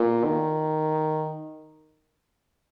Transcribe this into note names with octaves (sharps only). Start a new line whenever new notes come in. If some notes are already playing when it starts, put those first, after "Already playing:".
Already playing: A#2
D#3